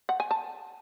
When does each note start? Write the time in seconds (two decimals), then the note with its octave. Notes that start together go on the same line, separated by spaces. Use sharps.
0.09 F#5
0.20 G#5
0.31 A5